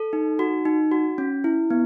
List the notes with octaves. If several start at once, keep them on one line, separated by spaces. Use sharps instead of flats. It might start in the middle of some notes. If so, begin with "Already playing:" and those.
Already playing: A4
D#4
F#4
D#4
F#4
C#4
E4
B3